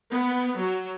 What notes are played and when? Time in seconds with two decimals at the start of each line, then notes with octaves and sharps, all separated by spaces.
0.12 B3
0.59 F#3